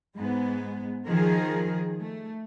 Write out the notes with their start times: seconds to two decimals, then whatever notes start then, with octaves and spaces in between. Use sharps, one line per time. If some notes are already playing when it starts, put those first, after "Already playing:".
0.17 G#2 G#3 B3
1.07 D#3 F3 G#4 A#4
1.99 A3